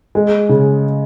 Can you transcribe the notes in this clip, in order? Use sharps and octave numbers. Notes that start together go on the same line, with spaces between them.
G#3
C#3